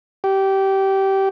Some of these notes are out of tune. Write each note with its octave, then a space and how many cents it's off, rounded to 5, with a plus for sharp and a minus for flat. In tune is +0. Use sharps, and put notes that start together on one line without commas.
G4 -20